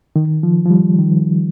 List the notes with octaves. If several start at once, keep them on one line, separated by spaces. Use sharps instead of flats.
D#3
F3
F3
G3
D#3